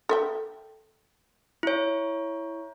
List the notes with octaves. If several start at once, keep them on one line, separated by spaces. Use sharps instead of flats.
A4 E5 G5
E4 C#5